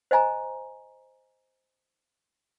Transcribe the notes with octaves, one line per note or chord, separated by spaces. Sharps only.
C5 D#5 G#5 A#5